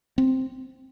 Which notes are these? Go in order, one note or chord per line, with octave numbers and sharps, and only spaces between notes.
C4